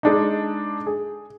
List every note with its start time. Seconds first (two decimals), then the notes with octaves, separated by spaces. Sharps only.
0.03 G#3 D4 D#4
0.86 G#4